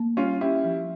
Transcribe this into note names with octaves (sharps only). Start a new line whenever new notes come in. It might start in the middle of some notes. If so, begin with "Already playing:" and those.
Already playing: A#3
G3 C#4 F4
C#4 E4 G4
F3